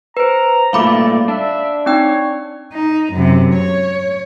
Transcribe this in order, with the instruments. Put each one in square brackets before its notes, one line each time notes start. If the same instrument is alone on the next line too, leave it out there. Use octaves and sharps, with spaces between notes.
[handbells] B4 C5 [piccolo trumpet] A#5
[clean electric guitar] G2 A#2 A3 [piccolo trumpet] D5 [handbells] F5 B5 D6
[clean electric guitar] D4 [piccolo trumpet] E5
[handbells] C4 D#4 G5 [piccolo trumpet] C#5
[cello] D#4
F#2 C3
C#5